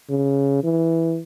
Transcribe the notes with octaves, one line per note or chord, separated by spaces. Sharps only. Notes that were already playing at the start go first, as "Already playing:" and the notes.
C#3
E3